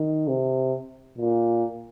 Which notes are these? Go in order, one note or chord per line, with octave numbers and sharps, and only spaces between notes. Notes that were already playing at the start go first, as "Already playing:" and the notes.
Already playing: D#3
C3
A#2